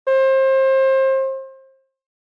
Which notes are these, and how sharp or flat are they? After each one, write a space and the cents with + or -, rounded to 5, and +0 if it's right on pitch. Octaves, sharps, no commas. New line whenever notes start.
C5 +30